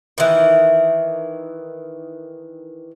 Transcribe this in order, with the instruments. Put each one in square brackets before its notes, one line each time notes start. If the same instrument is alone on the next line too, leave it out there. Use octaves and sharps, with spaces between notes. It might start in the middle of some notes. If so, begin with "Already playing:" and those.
[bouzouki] D#3 E3